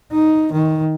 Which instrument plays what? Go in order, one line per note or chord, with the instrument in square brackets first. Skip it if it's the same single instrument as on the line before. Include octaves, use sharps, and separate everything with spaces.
[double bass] D#4
D#3